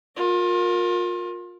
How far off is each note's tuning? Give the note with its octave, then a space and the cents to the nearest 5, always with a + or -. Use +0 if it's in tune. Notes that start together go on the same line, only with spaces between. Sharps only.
F4 +30 A#4 +0